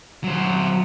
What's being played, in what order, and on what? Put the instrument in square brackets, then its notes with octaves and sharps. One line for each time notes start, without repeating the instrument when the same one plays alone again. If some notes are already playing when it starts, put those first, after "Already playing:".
[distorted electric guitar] F#3 C5